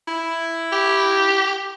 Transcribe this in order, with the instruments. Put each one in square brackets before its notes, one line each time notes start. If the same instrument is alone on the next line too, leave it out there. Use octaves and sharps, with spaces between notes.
[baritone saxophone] E4
[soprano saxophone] G4